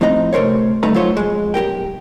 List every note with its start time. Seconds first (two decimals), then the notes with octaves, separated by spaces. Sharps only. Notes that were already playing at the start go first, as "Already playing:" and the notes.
0.01 A2 F3 C4 D#4 D#5 A#5
0.33 C3 A3 A#4 C5 C#5
0.83 D2 G2 A3 D#4 B4 A#5
0.94 F#3 A3 F4 C5 C#5
1.17 F2 G#3
1.54 B1 G4 A#4 G5